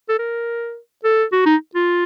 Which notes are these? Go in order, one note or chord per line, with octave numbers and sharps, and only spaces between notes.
A4
A#4
A4
F#4
D#4
F4